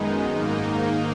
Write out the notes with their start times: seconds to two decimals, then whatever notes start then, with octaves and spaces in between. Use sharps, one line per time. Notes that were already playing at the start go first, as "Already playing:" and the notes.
Already playing: F#2 D#3 G#3 B3 D#4
0.31 G#2 D#3 A#3 D#4